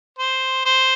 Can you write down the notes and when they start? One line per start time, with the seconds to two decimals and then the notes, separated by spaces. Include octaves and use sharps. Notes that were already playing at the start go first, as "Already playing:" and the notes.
0.18 C5
0.65 C5